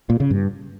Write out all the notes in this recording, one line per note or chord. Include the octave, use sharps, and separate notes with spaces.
A#2
C#3
G2